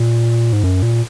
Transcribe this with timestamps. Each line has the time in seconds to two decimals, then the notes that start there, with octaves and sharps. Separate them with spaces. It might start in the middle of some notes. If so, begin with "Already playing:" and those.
Already playing: A#2
0.53 G#2
0.63 F#2
0.82 A#2